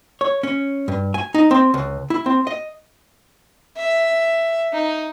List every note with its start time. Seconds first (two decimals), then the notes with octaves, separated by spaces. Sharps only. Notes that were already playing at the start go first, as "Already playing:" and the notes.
0.21 C#5
0.43 C#4
0.88 G2
1.14 G#5
1.34 D#4
1.51 C4
1.74 C#2
2.10 E4
2.26 C4
2.47 D#5
3.77 E5
4.73 D#4